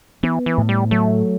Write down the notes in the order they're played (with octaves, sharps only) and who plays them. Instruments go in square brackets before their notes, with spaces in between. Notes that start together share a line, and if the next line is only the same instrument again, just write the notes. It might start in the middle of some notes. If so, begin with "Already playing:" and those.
[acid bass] E3 [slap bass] B3
[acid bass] E3
[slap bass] A2
[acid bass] G3
[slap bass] F#3 [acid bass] A3